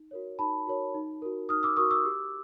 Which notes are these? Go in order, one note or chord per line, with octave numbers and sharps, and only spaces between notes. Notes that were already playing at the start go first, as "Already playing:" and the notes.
Already playing: D#4
F#4 A#4 C#5
D#4 A5 B5
F#4 A#4 C#5
D#4
F#4 A#4
D#4 D#6 F6
D6 E6
F#4 A#4 C#6 D#6
D6 E6
G4